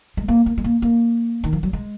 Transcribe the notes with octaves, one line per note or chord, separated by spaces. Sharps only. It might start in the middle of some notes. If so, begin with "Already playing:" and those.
G#3
A#3
A#3
G#3
A#3
A#3
D#3
F3
F#3
G#3